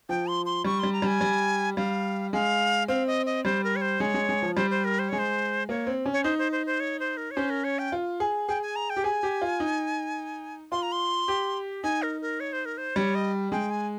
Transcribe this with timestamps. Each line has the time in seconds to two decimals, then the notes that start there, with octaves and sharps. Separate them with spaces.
0.09 F3 G5
0.27 C6
0.46 C6
0.64 G3 C#6
0.79 G3 C6
0.93 A#5
1.02 G3 G#5
1.21 G3
1.77 G3 F5
2.33 G#3 F5
2.88 C4 F5
3.07 D#5
3.26 D#5
3.45 G3 C5
3.64 A#4
3.76 C#5
3.81 C5
4.00 G#3 C#5
4.14 G#3
4.29 G#3
4.42 F3
4.57 G3 C5
4.70 C5
4.85 A#4
4.99 C5
5.09 G#3 C#5
5.19 C5
5.69 A#3 C#5
5.87 C4
6.06 C#4
6.13 C#5
6.24 D#4 C5
6.38 C5
6.52 C5
6.66 C5
6.80 C#5
7.00 C5
7.17 A#4
7.31 C#5
7.36 C#4 C5
7.50 A#4
7.64 C#5
7.79 G5
7.92 F4
8.20 G#4
8.48 G#4 G5
8.62 G#5
8.76 A#5
8.90 G5
8.97 G4
9.04 G#4 G#5
9.23 G4
9.42 F4
9.60 D#4
10.72 F4 C6
10.83 A#5
10.92 C6
11.28 G4
11.83 D#4 G#5
12.03 A#4
12.21 A#4
12.40 C#5
12.53 C5
12.65 A#4
12.78 C5
12.96 G3 C#5
13.15 D#5
13.51 G#3 G5
13.71 G#5